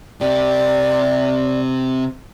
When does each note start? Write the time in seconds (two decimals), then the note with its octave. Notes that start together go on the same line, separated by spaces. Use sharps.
0.21 C3 G4 D5